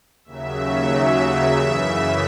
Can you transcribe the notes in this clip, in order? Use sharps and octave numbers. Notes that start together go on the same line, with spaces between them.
D#2 C#3 F#3 E5
E5
F#2 C#3 E3